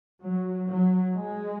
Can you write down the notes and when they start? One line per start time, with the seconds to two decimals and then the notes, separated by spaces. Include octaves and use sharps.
0.21 F#3
0.68 F#3
1.15 G#3